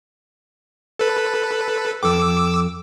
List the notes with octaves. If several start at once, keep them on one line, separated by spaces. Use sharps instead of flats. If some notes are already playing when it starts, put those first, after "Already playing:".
A4 B4
F2 A4 G5 D6 E6